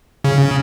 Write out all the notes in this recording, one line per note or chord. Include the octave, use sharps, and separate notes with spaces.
C#3